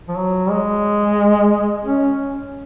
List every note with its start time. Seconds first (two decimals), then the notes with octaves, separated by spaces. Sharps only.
0.08 F3
0.17 F#3
0.50 G#3
1.84 C#4